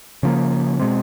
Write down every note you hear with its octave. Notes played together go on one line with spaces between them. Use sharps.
C#3 F3 A#3
B2 G#3 C4